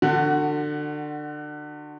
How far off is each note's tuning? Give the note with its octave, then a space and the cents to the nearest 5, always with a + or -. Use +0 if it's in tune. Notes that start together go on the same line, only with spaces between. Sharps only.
D3 +25 F#4 +0